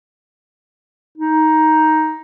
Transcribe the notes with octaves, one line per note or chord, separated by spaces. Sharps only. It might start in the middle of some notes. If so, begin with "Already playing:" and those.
D#4